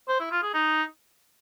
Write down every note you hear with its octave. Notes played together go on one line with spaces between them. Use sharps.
C5
E4
F4
G#4
D#4